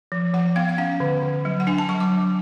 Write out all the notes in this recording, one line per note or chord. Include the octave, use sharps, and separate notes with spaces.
F3
F3 F#5
B3 F5
F5
C#4 F#5
D3
D3
F#3
F#5
D4 G#5
A5
F#3 C#6
D6
F#3